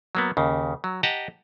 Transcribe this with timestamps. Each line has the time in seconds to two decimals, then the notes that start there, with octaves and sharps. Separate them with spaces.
0.15 F#3 A#3 B3
0.37 D#2 C#3
0.84 F#3
1.03 G4 D#5 F#5 A5 A#5